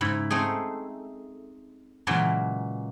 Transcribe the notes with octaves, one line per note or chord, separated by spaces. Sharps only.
G#2 C#3 E4 B5
A3 C4 D#4 G#4
A#2 C#3 E3 F#3 G#3 A#3